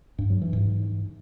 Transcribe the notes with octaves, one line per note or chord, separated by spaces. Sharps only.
G2
F#3
E3
G#2